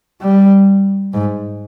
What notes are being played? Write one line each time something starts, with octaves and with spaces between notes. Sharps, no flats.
G3
G#2